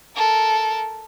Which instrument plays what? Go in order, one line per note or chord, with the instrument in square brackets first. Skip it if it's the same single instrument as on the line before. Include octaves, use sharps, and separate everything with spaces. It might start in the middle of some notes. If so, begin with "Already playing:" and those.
[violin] A4 A#4